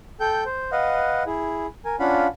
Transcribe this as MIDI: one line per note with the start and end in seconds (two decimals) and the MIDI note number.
0.20 0.44 69
0.20 0.44 79
0.20 0.44 91
0.46 0.71 72
0.72 1.24 71
0.72 1.24 75
0.72 1.24 77
0.72 1.24 78
1.26 1.67 64
1.26 1.67 68
1.85 1.96 70
1.85 1.96 80
2.00 2.27 61
2.00 2.27 62
2.00 2.27 65
2.00 2.27 77
2.00 2.27 78
2.00 2.27 83